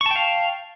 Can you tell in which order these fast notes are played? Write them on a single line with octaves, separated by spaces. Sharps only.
C#6 A5 G5 F5